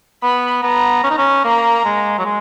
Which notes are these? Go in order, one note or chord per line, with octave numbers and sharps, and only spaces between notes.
B3 B5
B3 A#5
C#4
D#4
C#4
A#3 A#5
G#3
F#3
G#3